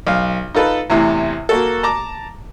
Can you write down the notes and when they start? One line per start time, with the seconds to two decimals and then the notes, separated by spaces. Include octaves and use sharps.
0.07 B1 F5
0.54 D#4 F4 A4 B4
0.90 E2 A2 C3 E3
1.49 A#3 F#4 A4
1.83 A5 A#5 D6